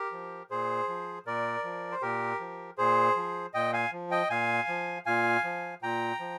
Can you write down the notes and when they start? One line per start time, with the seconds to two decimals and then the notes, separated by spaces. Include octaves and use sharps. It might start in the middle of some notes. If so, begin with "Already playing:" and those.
Already playing: G4 A#4
0.12 F3
0.50 A#2 G#4 C5
0.88 F3
1.26 A#2 A#4 D5
1.64 F3
1.91 C5
2.02 A#2 G4 A#4
2.40 F3
2.78 A#2 G#4 C5
3.16 F3
3.54 A#2 D#5 G5
3.73 F5 G#5
3.92 F3
4.11 D#5 G5
4.30 A#2 F5 G#5
4.68 F3
5.06 A#2 F5 G#5
5.44 F3
5.82 A#2 G5 A#5
6.20 F3